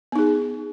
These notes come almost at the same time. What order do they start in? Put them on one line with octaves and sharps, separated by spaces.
B3 D#4 G#4